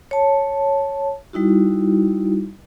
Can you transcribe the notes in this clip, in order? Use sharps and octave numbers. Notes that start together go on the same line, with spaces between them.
C#5 A5
G3 D#4 E4 F#4